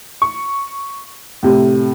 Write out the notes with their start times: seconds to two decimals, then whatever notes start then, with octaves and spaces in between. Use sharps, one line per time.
0.22 C#6
1.43 A2 C3